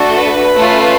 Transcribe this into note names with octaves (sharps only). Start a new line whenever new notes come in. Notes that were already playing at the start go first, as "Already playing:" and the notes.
Already playing: A3 D4 F#4 A4
B4
A3 C#4 F4